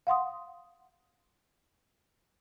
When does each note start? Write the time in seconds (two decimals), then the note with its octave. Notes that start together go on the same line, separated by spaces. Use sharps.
0.07 F5 F#5 C6 D#6